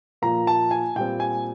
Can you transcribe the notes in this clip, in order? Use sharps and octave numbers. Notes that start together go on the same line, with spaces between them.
A#2 F3 A#3 A#5
A5
G#5
A#2 G3 C4 G5
G#5